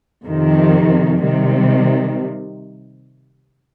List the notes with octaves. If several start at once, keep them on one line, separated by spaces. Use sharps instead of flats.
F2 C3 D#3
C3 D#3 G3